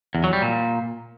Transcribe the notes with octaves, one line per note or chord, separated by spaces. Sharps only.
E2
F#3
G3
A#2